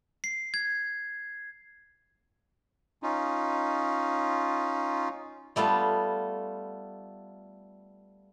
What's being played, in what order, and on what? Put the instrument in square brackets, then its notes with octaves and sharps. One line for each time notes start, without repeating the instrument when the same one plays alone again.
[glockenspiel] C7
G#6
[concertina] C#4 D#4 F4
[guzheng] G3 A3 B3 F4